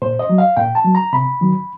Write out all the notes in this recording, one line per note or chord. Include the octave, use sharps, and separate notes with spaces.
A#2 C5
D#5
F#3
F5
A#2 G5
A5
F#3
A#5
C3 B5
D#3 F#3